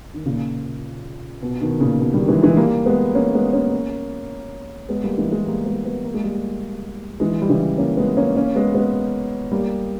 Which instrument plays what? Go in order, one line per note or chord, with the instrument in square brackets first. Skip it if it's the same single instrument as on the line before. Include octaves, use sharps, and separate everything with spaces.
[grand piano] D#3
A#2 C#3
B2
B2 D#3
A#2 C#3
B2
D#3 G3
E3 G#3
E3 G#3
G3 A#3
G#3 B3
A#3 C#4
G#3 B3
A#3 C#4
G#3 B3
G3 A#3
E3 G#3
E3 G#3
G3 A#3
G#3 B3
G#3 B3
A#3
G#3
G3 A#3
E3 G#3
G3
C#3 E3
A#3 C#4
G#3 B3
A#3 C#4
A#3 C#4
G#3 B3
G#3 B3
G3 A#3